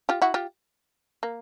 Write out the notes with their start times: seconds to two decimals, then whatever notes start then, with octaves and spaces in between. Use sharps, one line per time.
0.09 F4 G4
0.22 E4 F#4
0.34 F4 G4
1.23 A#3